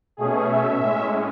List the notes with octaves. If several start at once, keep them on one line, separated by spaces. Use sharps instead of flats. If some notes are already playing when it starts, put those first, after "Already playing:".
B2 A3 C#4 G#4
E5
A2 G#3 C#4